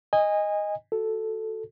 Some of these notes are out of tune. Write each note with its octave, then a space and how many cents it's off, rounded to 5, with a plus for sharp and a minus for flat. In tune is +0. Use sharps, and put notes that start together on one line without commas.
D#5 +0 G#5 -25
F#4 +0 A4 +0